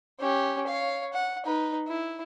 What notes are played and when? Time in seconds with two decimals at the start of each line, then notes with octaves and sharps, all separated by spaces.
0.20 C#4 G4
0.67 C#5 F5
1.13 F#5
1.45 D#4 B4
1.87 E4